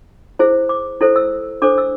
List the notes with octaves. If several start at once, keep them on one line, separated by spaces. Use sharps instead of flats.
E4 G#4 C5
D6
E4 A4 C5
E6
D4 A4 C5 D6
E6